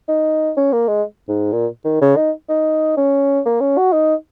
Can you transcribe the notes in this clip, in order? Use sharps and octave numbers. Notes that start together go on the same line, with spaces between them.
D#4
C#4
A#3
G#3
G#2
A#2
D#3
C#3
D#4
D#4
C#4
A#3
C#4
F#4
D#4